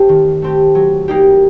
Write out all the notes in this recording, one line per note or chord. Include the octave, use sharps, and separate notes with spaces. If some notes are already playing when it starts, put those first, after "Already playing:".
Already playing: A3 C4 G4
D#3
A3 C4 G4
F#3
A#3 D#4 G4